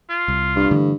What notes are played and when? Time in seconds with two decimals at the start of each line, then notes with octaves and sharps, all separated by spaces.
0.10 F4
0.28 C2
0.56 G2
0.71 D3 E3 A3